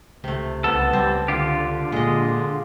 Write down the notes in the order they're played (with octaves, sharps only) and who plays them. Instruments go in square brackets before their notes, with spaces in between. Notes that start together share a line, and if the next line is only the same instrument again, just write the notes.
[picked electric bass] C#2 [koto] C3 A3
[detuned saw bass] C2 [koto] B3 [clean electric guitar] A4
[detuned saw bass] G3 [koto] C4
[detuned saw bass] D3 [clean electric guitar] F4 G4
[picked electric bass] A#2 [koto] G#3 D#5